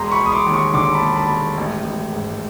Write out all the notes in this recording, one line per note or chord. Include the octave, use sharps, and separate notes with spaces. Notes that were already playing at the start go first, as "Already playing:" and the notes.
Already playing: E1 A#5 C6
B5 C#6
E1
D#6
C6 D6
D#2
C#6 D#6
D3 C6 D6
A5 B5
E1
A5 B5
E1
A1
A1
G#2